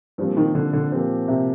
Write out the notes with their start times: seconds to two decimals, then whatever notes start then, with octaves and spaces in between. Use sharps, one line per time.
0.18 G2 A#2 F3 C4 G4
0.37 D#3
0.55 D3
0.73 D3
0.91 A#2 F3 C4 G4
1.28 C3